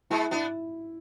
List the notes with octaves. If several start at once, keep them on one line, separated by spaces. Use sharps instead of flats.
G#3 B3 E4
B3 D4 E4